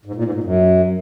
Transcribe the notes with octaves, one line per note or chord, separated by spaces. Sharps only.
G#2
A#2
G#2
A#2
F#2